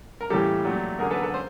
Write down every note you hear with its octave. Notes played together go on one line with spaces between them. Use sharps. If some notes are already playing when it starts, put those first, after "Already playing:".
A#4
A2 E3 G3 A#3 G4 A4
A#2 F#3 A3
D3 F#3 A#3 G#4 A#4
A4 B4
A4 B4
C5